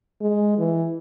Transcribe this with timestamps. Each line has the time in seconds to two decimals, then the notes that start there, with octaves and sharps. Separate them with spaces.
0.21 G#3
0.59 E3